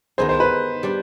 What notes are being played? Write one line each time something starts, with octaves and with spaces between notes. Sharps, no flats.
D#3 B3 D#4 G#4 C5
C5
B4
G3 D4